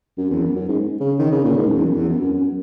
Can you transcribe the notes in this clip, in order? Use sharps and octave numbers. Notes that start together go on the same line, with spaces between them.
F#2
E2
F#2
F#2
G#2
C#3
D#3
C#3
A#2
G#2
F#2
E2
F#2
E2
F#2
F#2
F#2